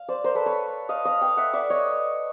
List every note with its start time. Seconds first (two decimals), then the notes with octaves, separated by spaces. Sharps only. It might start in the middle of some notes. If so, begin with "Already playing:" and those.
Already playing: F5
0.08 C5 D5
0.24 A#4 C5
0.35 A4 B4
0.46 B4 C#5
0.89 D#5 F5
1.05 D#5 F5
1.21 F5 G5
1.37 E5 F#5
1.53 D5 E5
1.70 C#5 D#5